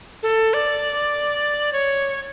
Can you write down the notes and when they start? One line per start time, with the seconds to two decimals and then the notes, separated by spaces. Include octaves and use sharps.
0.23 A4
0.54 D5
1.73 C#5